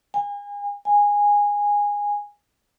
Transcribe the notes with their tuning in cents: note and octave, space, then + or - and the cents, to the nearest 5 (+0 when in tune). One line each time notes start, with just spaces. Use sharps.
G#5 -40
G#5 -15